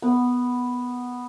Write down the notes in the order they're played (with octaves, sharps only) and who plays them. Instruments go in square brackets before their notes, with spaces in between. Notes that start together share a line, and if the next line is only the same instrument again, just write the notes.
[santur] B3